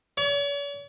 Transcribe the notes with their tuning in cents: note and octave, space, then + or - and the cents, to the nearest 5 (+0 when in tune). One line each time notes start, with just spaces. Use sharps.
C#5 +45